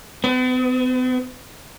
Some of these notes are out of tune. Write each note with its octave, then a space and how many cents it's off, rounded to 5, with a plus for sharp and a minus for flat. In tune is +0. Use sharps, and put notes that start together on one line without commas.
B3 +45